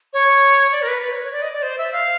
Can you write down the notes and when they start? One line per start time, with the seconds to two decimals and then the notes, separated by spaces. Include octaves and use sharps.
0.13 C#5
0.72 D5
0.82 A#4
0.88 B4
1.02 B4
1.13 C#5
1.23 C#5
1.33 D5
1.42 D#5
1.53 D5
1.62 C5
1.78 E5
1.92 F5